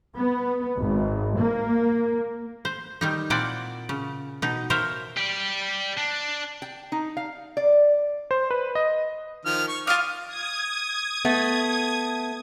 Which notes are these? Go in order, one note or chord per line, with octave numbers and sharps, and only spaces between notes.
B3
G#1
A#3
C5
D#3 G3 D#4
A#2 A#3 C4 E4 D5 F#5
C#3
B2 D#4
A#4 C5 C#5 E5 F5
G4 D5
D4
G5
D#4
F5
D5
C5
B4
D#5
D#3 F3 F6
C#6
F4 F5 D6 D#6 F6
D#6 G#6
A3 B3